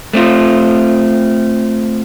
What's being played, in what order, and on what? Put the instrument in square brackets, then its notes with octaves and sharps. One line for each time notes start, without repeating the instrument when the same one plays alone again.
[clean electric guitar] A3 C4 F4